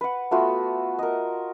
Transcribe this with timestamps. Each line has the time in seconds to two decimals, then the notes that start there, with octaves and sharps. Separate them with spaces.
0.01 B4 F#5
0.31 A3 B3 F4 F#4
0.99 A#4 D#5